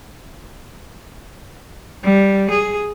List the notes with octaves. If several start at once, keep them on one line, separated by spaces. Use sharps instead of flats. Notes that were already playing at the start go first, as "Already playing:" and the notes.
G3
G#4